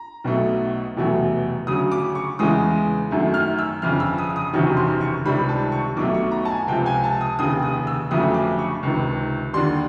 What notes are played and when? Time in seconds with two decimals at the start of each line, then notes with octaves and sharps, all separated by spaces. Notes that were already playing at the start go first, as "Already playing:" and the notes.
Already playing: A#5
0.24 B1 B2 F#3 A3
0.97 F1 E2 B2 F#3 A3
1.67 D2 C#3 F#3 D#6
1.92 D6
2.15 C#6
2.39 E2 C#3 E3 G#3 D#6
3.11 F#2 D#3 F#3 A3
3.34 F6
3.59 E6
3.82 G1 F2 C#3 F6
4.00 E6
4.18 D#6
4.36 D#6
4.53 F#1 E2 C3 D#3 F#3 C#6
4.77 C6
5.01 C#6
5.25 C#2 C3 D#3 G3 B5
5.49 A5
5.72 C#6
5.97 B1 B2 F#3 A3 D6
6.14 C#6
6.32 A#5
6.45 A5
6.50 G#5
6.67 C#2 C3 F3 G5
6.86 G#5
7.04 A5
7.21 D#6
7.39 F1 D#2 C#3 D#6
7.63 D#6
7.87 E6
8.11 G1 F2 C#3 F#3 A3 D#6
8.34 D6
8.59 C#6
8.83 C#2 C3 D#3
9.53 D#2 D3 G3 C6